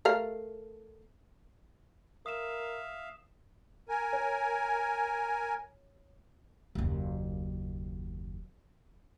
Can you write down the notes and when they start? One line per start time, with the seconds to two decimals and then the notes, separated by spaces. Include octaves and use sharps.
0.05 A3 A#4 F5
2.26 A#4 E5 F5 D#6 E7
3.89 A#4 G#5
4.13 C#5
6.75 F#1 D#2